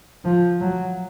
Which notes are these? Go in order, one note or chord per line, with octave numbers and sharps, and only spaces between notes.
F3
F#3